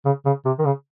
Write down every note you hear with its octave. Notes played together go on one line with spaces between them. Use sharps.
C#3
C#3
C3
D#3
C#3